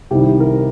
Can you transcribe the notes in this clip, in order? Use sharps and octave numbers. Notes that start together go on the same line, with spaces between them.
C2 C3 D#3 G3 D#4 G4
A#4